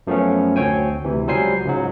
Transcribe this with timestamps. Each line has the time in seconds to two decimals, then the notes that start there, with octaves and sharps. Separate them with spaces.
0.07 F#2 F3 A3 B3 C#4
0.56 D2 C4 C#5 G5 G#5
1.04 D2 C3 E3
1.27 C#2 F#3 G3 C5 G#5 C7
1.65 C#2 G#2 F#3